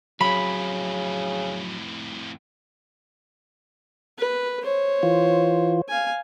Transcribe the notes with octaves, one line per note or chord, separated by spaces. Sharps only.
F2 A2 C#3 F#3 B5
B4
C5 C#5
E3 F4
F5 G#5